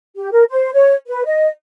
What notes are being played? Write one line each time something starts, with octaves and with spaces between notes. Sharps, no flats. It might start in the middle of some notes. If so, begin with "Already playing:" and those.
G4
A#4
C5
C#5
B4
D#5